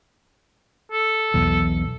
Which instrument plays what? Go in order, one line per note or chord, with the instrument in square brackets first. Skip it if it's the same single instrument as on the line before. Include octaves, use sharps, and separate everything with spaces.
[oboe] A4
[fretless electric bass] B1 E2